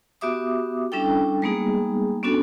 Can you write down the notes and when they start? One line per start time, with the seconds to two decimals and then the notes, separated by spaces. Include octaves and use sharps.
0.21 B3 F#4 G4 E5 D6 D#6
0.92 G3 C#4 D4 E4 A4 G5
1.42 G3 G#3 A#3 B3 D#4 G#4
2.23 B3 C#4 D4 F#4 A4